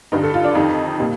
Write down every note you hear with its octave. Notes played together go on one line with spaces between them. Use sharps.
G2 D3 G3 D#4
A4
F4
D4
F2 D#3 G3 D#4
A#2 G3